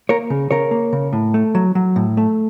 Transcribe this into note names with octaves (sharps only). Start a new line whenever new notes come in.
A#3 A#4 C#5
C#3
C#3 A#4 C#5
A#3
C#3
A2
A3
F#3
F#3
A2
A3